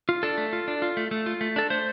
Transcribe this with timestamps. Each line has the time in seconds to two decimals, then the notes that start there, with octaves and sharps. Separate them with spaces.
0.09 F4
0.23 D4 A4
0.38 A3
0.53 F4
0.68 D4
0.82 F4
0.97 A3
1.11 A3
1.26 F4
1.41 A3
1.56 D4 A4
1.70 A3 C5